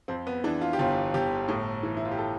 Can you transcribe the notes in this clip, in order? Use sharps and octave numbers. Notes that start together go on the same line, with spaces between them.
F2 C4
B3
E3 D4
F4
G4
G1 F4
G1 G4
A2
E3
E4
F4
G4
A4